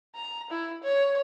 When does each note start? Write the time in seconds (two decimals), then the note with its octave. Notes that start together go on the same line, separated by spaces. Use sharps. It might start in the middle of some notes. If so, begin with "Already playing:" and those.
0.15 A#5
0.50 E4
0.83 C#5